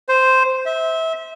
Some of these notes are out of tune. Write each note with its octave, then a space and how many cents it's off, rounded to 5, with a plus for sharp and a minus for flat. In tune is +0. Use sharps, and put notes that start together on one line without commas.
C5 -5
E5 -25